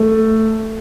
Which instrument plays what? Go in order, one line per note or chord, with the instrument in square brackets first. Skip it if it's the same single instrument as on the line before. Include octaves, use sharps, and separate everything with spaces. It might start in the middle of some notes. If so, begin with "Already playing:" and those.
Already playing: [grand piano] A3